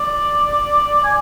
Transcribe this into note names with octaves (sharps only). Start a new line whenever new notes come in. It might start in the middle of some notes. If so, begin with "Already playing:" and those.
Already playing: D5
G#5